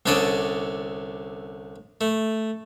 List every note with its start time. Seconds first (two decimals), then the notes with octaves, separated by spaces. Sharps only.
0.06 C2 D3 C#4 A4 D5 D#6
2.01 A3